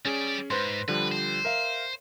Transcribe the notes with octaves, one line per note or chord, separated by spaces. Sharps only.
G3 C#4 G#4 D5
G#2 B4 C5 C6
D3 F3 G3 B4
C5
A#4 E5 F5